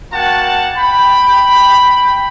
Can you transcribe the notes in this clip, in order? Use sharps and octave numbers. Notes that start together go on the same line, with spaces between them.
A#3 F#4 F#5 G5 A5
G5 B5